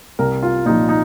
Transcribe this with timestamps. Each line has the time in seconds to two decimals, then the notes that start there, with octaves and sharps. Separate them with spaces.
0.19 C2 A#4
0.42 F4
0.65 A#2 D#4
0.69 F3
0.89 D#4